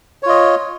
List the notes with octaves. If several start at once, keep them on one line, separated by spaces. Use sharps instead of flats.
F4 C#5 D#5